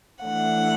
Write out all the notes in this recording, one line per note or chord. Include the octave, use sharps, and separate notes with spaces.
E3 A3 D4 F#5